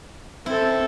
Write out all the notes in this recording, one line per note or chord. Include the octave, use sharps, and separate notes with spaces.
C4 E4 A4